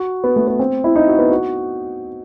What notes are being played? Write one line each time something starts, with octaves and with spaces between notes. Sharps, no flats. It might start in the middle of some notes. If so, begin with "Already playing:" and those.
Already playing: F#4
B3
A3
B3
C4
E4
D#4
F#4
B3
F#4